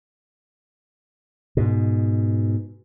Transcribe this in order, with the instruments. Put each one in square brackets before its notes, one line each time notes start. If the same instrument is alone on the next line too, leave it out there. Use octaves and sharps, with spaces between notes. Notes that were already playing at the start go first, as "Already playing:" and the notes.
[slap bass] G#2 B2